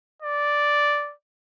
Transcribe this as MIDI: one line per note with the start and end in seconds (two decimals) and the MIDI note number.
0.22 1.14 74